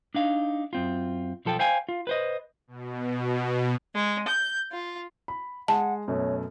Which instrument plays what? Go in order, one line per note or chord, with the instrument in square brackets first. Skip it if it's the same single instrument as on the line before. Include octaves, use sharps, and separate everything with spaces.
[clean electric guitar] D4 D#4 F5
F#2 C4 F4
B1 F3 A4 G5 A5
C5 F5 G5 G#5
F4
B4 C5 D#5
[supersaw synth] B2
[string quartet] G#3
G6
F4
[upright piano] B5
[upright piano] G#3 [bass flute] F#5 [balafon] A5
[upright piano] F#2 B2 A3 [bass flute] C#5